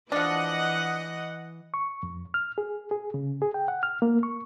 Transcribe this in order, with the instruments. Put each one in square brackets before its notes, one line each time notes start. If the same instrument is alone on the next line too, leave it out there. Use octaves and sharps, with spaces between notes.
[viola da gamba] E3 [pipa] F3 D4 [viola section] D#5 F#5
[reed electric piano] C#6
F2
F6
G#4
G#4
C#3
G#4
G5
F#5
F6
A#3
C#6